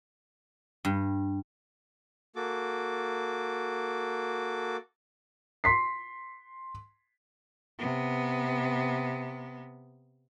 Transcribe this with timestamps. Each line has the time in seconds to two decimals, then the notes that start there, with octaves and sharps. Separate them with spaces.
0.85 G2
2.36 A#3 F#4 A4 D6
5.64 C6 B6 C7
7.79 C3 B3